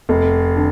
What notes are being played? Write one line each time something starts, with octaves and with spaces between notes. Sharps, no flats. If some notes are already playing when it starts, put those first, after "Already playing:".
F1
D3